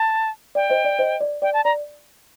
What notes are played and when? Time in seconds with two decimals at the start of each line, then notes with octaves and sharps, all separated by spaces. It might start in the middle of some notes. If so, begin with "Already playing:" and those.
Already playing: A5
0.55 D5 G5
0.70 C5 D#5
0.85 D5
0.99 C5 D#5
1.21 D5
1.42 D5 G5
1.53 A5
1.64 D5 A#5